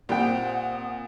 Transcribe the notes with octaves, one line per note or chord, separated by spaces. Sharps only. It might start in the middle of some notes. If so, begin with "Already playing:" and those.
A#2 G3 C4 F#5 G5 D#6